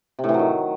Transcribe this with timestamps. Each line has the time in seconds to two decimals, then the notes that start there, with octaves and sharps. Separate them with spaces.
0.19 C3
0.24 A2
0.29 E3
0.34 F#3
0.39 D#3